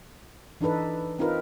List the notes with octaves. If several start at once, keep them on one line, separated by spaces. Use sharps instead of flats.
E3 D4 D#4 A4 B4
C4 D#4 F4 A#4 B4